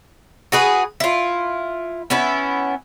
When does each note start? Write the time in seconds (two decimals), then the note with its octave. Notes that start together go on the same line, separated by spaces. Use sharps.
0.52 F#4 G#4 B4
1.00 E4 F4
2.10 B3 C#4 E4